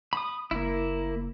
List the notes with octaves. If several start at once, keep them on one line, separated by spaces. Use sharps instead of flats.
B5 D#6
F#1 A#3 E4